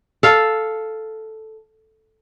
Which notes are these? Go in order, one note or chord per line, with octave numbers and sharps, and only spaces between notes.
A4 F5